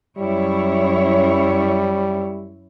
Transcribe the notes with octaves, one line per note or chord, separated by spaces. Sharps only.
F#2 G3 E4 C#5